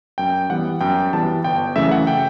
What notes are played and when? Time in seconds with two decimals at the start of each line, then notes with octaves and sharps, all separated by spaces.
0.18 F#2 G5
0.50 E3 G3 B3 F#5
0.81 F#2 G5
1.13 E3 G3 B3 A5
1.44 G1 G5
1.75 F#2 C#3 E3 A3 E5
1.91 F#5
2.07 G5